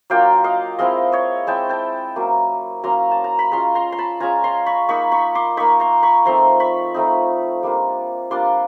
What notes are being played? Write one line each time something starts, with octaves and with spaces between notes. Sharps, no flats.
F#3 A#3 D4 F4 F5 G5
D#5 F5
G#3 C4 E4 D#5 F5
C#5 D#5
G#3 C4 E4 G5 A5
G5 A5
F#3 A#3 C#4
F#3 A#3 C#4 A#5 C6
A5
A#5
B5
G#3 C#4 F4 A#5 C6
A#5 C6
C6
A5 B5
G#3 C#4 F4 G#5 A#5
A#5 C6
B5 C#6
A#3 D#4 B5 C#6
B5 C#6
C6 D6
A#3 D#4 B5 C#6
A#5 C6
B5 C#6
F3 A3 C4 D#4 A#5 C6
B5 C#6
F3 A3 C4 D#4
G3 A#3 D4 F4
G3 A#3 D4 F4 C6 D6